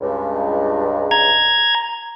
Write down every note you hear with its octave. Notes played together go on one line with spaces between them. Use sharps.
C#2 G2
A#5 G#6